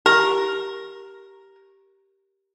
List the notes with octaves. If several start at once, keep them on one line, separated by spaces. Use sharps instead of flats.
G4 A#4